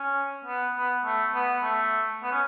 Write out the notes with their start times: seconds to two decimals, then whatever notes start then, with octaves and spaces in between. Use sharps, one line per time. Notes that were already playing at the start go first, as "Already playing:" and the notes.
Already playing: C#4
0.45 B3
0.75 B3
1.05 A3
1.35 B3
1.63 A3
2.23 B3
2.32 C#4